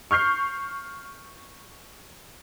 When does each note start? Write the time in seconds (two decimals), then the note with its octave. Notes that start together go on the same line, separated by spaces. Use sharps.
0.11 C#6 F6 G6 C7